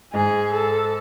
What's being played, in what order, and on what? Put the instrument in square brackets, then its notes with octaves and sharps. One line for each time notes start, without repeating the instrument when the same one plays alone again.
[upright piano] G#2 [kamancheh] G#4
[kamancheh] A4